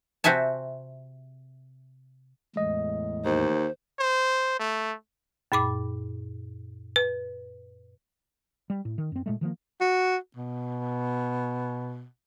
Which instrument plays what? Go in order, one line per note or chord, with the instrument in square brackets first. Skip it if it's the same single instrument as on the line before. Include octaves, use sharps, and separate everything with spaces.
[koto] C3 C4 F#4 E5 G#5 A5
[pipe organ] E2 A2 [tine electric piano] G#3 D#5
[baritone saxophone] D#2 [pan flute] C5
[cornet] C5
A3
[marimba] F#2 A#2 B5 D6
B4
[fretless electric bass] G3
A2
D#3
F#2 C4
A#2 G#3 A3
D#3 F3 A3 A#3
[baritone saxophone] F#4
B2